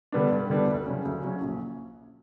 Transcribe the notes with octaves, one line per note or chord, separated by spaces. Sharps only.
D3 G3 B3 D4
G2
D3 G3 B3 D4
D2
C#3 F#3 C#4
D2
C#3 F#3 C#4
A#1